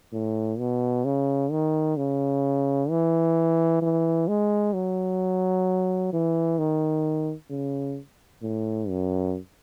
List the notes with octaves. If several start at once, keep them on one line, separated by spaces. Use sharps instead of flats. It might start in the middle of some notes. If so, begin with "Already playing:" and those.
A2
B2
C#3
D#3
C#3
E3
E3
G#3
F#3
E3
D#3
C#3
A2
F#2